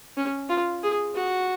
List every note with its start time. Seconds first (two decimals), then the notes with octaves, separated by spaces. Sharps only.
0.17 C#4
0.49 F4
0.83 G#4
1.15 F#4